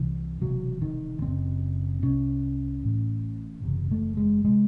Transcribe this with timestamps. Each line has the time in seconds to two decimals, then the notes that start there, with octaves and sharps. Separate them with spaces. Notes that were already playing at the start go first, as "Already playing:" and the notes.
Already playing: C2 C3 E3
0.42 E1 E2 C3 F#3
0.82 D#3
1.22 F#1 F#2 C#3 C4
2.02 C2 C3 C#4
2.84 A1 A2
3.64 F#1 E2 C3
3.91 A3
4.17 G#3
4.45 C3 G#3